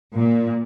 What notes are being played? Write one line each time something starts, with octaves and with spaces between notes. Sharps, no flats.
A#2